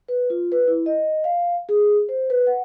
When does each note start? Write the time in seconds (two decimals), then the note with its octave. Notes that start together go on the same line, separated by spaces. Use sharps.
0.08 B4
0.30 F4
0.52 B4
0.68 E4
0.86 D#5
1.24 F5
1.69 G#4
2.09 C5
2.30 B4
2.47 F#5